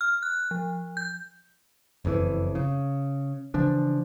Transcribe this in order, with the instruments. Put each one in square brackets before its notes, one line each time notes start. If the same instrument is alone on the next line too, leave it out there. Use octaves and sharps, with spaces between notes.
[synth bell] F6
F#6
F3
G6
[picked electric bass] F#1 F2 G#2 E3
C#3
C#3 E3 F3 D4